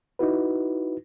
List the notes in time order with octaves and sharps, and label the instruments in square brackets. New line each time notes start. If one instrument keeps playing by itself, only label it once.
[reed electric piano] D#4 E4 F#4 B4